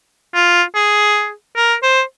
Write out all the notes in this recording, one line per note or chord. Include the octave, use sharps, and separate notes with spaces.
F4
G#4
A#4
C5